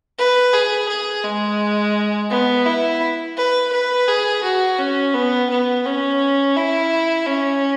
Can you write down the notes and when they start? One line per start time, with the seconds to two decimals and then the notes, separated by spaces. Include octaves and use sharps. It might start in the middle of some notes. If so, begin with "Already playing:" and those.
0.18 B4
0.53 G#4
0.88 G#4
1.24 G#3
2.30 B3
2.66 E4
3.37 B4
3.72 B4
4.08 G#4
4.43 F#4
4.79 C#4
5.14 B3
5.50 B3
5.85 C#4
6.56 E4
7.27 C#4